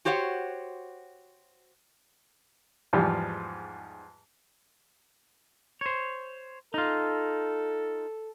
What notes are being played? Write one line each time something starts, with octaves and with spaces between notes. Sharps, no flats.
F#4 G4 C5 C#5 F5 F#5
E2 G#2 F3 G3
C5 C#5
D#4 F4 A4